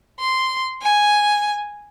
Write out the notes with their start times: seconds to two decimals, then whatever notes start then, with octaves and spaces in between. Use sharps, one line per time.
0.20 C6
0.82 G#5